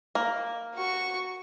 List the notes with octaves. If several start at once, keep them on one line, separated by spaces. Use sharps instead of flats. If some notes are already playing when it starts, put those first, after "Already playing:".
A#3
F#4 C#6